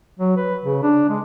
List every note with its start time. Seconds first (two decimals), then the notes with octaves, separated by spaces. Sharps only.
0.19 F#3
0.36 B4
0.63 C#3
0.83 D4
1.09 G#3